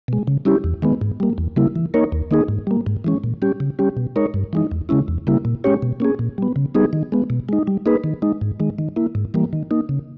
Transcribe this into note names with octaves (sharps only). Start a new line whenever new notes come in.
B2 G#3
C#3
G3 C#4 E4 G4
E2
D#3 G#3 B3
G#2
G3 A#3
E2
C#3 G3 A#3 E4
E3
A#3 D#4 A#4 C#5
D#2
D#3 A#3 D#4 G#4
G#2
G3 A#3
G#2
E3 G#3 C#4
A#2
G3 C#4 G4
C#3
G3 C#4 G4
B2
G#3 D#4 A#4 C#5
G2
E3 G#3 D#4
E2
C#3 G#3 C#4 E4
E2
C#3 G3 A#3 E4
A#2
G#3 C#4 G4 C#5
B2
A#3 C#4 G#4
A#2
G3 B3
C#3
G3 B3 D#4 G#4
D#3
G#3 B3
B2
G#3 D#4
G3
A#3 D#4 G#4 B4
D#3
G#3 D#4
G#2
D#3 G#3
D#3
A#3 E4
G#2
E3 G3 A#3
D#3
A#3 D#4
C#3